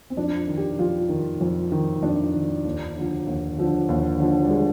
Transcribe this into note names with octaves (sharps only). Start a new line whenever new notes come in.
C4
F2 D4
D#3
G4
F2 F4
D#3
F2
D#3
F2 D4
D#3
D#2
D3 F3
D#2
D3 F3
D#2
D3 F3
G3
G#3